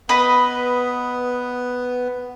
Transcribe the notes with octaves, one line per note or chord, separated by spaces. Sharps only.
B3 B4 D#5